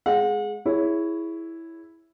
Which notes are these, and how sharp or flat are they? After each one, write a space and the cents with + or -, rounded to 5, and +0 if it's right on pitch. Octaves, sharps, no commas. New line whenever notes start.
G#3 +10 G#4 +10 F#5 -40
E4 +0 G#4 +0 C#5 +10